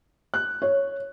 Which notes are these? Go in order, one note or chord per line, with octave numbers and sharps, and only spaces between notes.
F#6
C#5